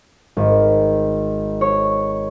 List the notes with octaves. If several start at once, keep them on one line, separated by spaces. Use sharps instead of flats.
G#1
C#5